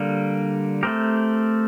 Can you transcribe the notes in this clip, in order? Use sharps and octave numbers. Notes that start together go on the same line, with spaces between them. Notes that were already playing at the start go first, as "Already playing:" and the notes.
Already playing: D3 G3 A#3
A3 C4 G4 A#4